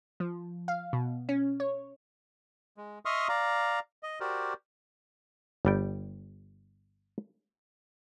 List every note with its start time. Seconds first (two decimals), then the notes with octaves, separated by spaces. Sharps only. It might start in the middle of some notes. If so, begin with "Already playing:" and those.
0.20 F3
0.68 F5
0.93 B2
1.29 C#4
1.60 C#5
2.77 G#3
3.05 D#5 E5 C6 C#6 D#6 F6
3.29 D5 F5 A#5
4.03 D#5
4.20 F#4 G4 A#4 C5 D5
5.65 G1 G3 G5